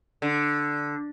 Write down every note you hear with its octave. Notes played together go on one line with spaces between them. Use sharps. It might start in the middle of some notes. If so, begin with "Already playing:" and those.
D3